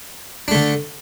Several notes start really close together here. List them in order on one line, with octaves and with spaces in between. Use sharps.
D4 A3 D3